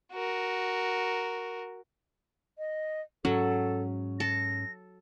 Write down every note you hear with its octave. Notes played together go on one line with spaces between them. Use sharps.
F#4 A#4
D#5
G#2 F#3 C#4 A4
A4 A#6